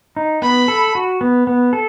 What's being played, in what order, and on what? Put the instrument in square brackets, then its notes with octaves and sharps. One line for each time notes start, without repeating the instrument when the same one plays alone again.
[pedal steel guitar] D#4
[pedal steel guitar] B3 [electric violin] B5
[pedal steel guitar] A4
F#4
B3
B3
A4